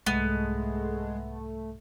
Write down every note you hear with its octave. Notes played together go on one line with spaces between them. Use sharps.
C2 G#2 G#3 A3 B3